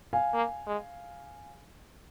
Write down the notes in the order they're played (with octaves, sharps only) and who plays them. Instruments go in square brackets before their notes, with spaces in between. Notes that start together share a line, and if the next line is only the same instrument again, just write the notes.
[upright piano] F5 G#5
[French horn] A#3
G#3